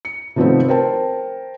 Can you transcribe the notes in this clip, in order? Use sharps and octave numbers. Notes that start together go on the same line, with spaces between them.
C#7
C3 D#3 F3 A3 B3 C4
A#4 C5 G5 A5